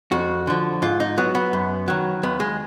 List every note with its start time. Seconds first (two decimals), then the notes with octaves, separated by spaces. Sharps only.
0.12 F2 F#4
0.47 D3 F3
0.82 G#2 F4
1.00 D#4
1.18 F#3 B3
1.35 B3
1.53 F#2
1.88 D#3 F#3
2.23 D#2 B3
2.40 G#3